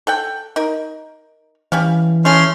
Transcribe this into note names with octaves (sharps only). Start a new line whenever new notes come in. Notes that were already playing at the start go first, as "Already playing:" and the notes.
A4 F#5 G5
D#4 A#4
E3 G3 C#4 F5
A3 C#4 G#4 C6 F6